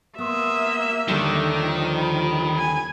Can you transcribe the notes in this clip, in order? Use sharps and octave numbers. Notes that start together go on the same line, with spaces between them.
A#3 B3 E5 C6 D#6
D#2 D3 D#3 G3 A3 G4
F3
B5
G#5